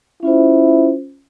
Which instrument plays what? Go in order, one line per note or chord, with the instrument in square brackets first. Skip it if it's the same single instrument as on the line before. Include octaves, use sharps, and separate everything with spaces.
[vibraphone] C#4 F4 C5 [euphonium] E4